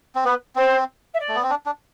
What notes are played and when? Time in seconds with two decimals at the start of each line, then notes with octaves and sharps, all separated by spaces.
0.15 C4
0.25 B3 B4
0.56 C4 C5
1.14 E5
1.20 D5
1.29 A3
1.35 B3
1.43 C4
1.50 D4
1.66 D4